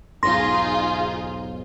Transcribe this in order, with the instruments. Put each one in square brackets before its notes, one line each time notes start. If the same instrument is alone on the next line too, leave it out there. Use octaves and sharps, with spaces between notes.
[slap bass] B1 E2 G#2 [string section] D#4 F4 G#4 [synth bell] C6 A#6